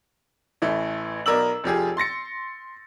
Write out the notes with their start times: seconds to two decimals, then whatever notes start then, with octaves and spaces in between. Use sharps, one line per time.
0.62 A1 E3 A3
1.26 B1 B2 A#4 D5 E6 F#7
1.64 F1 F3 G4 G#4
1.97 C6 A6 A#6 C#7